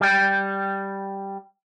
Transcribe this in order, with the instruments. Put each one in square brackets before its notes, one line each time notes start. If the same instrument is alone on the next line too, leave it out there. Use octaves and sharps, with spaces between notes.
[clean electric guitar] G3 G5